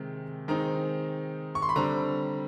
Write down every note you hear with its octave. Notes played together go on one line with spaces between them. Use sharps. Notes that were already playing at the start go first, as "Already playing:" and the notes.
Already playing: C3 D#3 G#3 C4
D#3 G#3 C4 D#4 A#5
C#6
C6
B5
D3 G3 C4 A#5